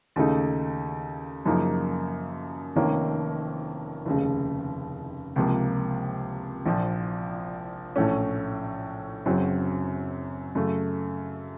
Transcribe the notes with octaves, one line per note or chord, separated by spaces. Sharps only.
D#2 C#3 A3 D#4
F#2 C#3 F3 A#3 D#4
F1 F2 D#3 A#3 C#4
F1 D#2 C#3
C#2 C3 F3 A#3
A#1 A#2 F3
A#1 A2 A3 C#4
F#1 F#2 C#3 F#3 C4
F#2 C#3 A3